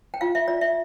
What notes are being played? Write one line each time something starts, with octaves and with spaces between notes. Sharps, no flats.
G5
F4 F5
E5
F4 D5
E5